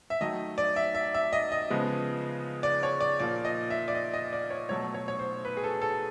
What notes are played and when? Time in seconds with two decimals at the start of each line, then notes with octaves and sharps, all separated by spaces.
0.10 E5
0.21 D#3 F#3 A3 D#5
0.58 D5
0.76 E5
0.95 E5
1.14 E5
1.33 D#5
1.52 D#5
1.70 C#3 F3 G#3 B3
2.63 D5
2.83 C#5
3.01 D5
3.20 A#2 F3 A#3 D5
3.45 D#5
3.70 E5
3.88 D5
3.95 D#5
4.13 D#5
4.33 D5
4.50 C#5
4.69 B2 F#3 A3 C#5
4.94 C#5
5.08 C#5
5.19 C5
5.45 B4
5.57 G#4
5.64 A4
5.82 A4